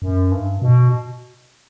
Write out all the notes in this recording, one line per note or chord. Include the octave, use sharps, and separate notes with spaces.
F#2
G2
B2